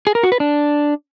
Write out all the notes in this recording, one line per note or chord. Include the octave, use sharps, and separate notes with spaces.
G#4
A#4
F#4
B4
D4